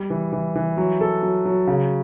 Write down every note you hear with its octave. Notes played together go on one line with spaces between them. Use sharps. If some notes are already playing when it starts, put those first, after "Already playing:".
Already playing: G3
E3
E3
E3
F#3
A4
F#3
F#3
C#3